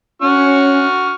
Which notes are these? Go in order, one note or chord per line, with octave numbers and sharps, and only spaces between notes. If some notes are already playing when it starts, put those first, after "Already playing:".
C#4 F#4 C#6 F6